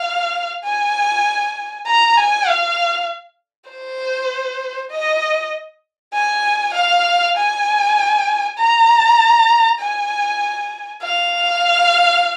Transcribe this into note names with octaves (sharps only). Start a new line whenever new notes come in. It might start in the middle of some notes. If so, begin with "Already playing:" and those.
Already playing: F5
G#5
A#5
G#5
F5
C5
D#5
G#5
F5
G#5
A#5
G#5
F5